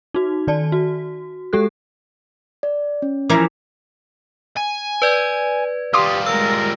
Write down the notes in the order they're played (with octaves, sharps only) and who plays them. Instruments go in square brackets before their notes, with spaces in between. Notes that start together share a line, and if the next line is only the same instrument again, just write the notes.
[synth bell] D#4 F#4
D#3 D5 A5
F#4
G#3 G4 A4 F#6
[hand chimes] D5
C#4
[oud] E3 F3 A#4 [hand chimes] D6 B6
[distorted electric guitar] G#5
[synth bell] B4 D5 G#6
[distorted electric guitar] G3 F4 [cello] G4 [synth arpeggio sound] C6 D6 D#6
[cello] G#3 A#4 [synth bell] E6